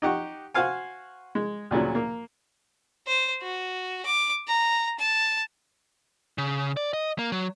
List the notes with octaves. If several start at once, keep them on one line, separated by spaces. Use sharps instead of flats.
D#4 G4 F#5 C#6
F#4 C5 F5 G#5
G#3
D2 A#2 C#3 F#3
A#3
C5
F#4
D6
A#5
A5
C#3
D5
D#5
A#3
F#3